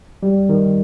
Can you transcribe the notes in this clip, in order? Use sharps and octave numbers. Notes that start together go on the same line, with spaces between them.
G3
D#3